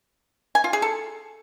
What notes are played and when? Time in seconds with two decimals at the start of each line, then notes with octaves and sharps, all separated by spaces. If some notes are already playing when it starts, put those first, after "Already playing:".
0.55 G#5
0.64 F4
0.73 G#4
0.82 A4